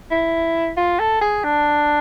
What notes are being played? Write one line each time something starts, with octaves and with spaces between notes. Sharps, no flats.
E4
F4
A4
G#4
D4